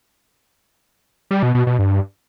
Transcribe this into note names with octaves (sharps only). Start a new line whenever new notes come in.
G3
B2
B2
B2
G2